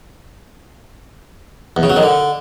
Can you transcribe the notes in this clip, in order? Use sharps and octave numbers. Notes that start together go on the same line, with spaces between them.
E2
C#3
F#3
D#3
D3